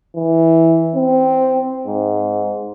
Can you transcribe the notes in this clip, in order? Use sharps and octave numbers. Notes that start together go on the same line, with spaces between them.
E3
C4
G#2